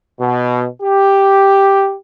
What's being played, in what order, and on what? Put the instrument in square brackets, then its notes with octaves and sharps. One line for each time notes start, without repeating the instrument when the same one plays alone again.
[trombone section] B2
G4